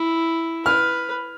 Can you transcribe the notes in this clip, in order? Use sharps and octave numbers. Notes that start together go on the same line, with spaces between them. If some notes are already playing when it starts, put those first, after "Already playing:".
Already playing: E4
B4 F6